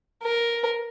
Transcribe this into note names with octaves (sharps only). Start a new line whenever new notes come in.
A#4